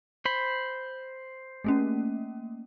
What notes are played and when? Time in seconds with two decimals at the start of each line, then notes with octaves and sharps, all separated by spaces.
0.25 C5 B5
1.64 A3 A#3 C#4